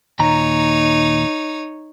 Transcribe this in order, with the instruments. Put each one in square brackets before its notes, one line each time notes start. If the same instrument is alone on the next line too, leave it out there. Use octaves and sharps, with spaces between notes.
[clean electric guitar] D#2 A#2 A#5 [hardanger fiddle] D#4 C#5